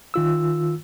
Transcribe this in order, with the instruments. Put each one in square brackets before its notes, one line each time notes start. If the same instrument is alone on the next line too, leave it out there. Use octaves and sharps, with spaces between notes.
[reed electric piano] D#3 F4 E6